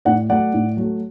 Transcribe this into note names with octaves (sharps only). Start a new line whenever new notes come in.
A2 D5 F#5
F#3 A3 D5 F#5
A2
F#3 A3